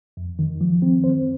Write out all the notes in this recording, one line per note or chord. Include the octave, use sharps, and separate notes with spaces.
F2
D#3
F3
C4
C5